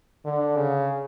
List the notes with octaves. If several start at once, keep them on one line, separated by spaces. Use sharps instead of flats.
D3
C#3